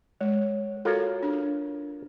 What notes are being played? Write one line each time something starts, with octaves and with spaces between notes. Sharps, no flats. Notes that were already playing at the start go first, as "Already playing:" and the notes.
G#3 C#5
F4 F#4 A4 A#4 C#5
D4